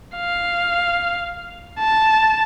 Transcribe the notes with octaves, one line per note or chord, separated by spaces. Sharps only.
F5
A5